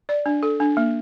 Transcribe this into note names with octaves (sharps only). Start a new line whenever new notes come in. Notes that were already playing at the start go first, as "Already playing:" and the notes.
D5
D4
A4
D4
A#3